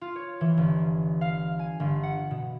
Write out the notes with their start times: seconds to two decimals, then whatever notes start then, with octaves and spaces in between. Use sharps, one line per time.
0.01 F4
0.16 C#5
0.41 E3
0.57 G1
1.21 F5
1.59 G#5
1.80 G1
2.03 F#5
2.31 B2